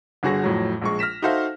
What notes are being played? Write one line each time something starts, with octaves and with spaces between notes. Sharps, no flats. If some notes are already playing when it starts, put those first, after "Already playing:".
G1 D3 F#4 G#4 C#6 A#6
F2 A2 F#3
A#1 G#3 C#6
F6 A#6 B6 E7
D#4 F#4 A4 C5 E5 F5